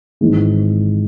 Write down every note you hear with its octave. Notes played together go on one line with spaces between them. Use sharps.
G#1 G#2 E3 G#3